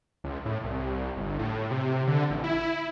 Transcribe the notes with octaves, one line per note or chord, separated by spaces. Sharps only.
C#2
A2
C2
G1
A2
C3
D3
A1
E4